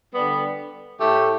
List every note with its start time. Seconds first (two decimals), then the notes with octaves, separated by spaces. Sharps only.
0.14 D3 G3 B3
0.99 A2 A3 G4